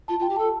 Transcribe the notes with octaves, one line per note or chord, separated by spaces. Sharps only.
F4 A5
F4 G5
G4
A4 A5